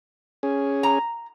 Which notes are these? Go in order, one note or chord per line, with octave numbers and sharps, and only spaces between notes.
C#4 G#4
A#5